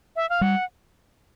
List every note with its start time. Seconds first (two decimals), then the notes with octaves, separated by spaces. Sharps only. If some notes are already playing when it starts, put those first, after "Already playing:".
0.16 E5
0.30 F5
0.41 G3 F#5